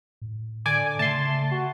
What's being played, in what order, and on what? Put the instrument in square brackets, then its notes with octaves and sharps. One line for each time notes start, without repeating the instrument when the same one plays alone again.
[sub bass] A2
[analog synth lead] D3 [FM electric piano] D5 G#5 D6
[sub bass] C#3 [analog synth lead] A3 [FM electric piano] A5 C6
[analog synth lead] F#4